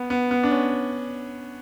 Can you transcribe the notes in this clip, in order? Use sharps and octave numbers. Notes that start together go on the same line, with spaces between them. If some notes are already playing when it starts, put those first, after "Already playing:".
Already playing: B3
B3
B3
D4
C#4